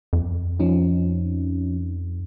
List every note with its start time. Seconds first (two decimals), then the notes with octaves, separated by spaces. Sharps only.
0.13 F2
0.59 F3 C#4 D#4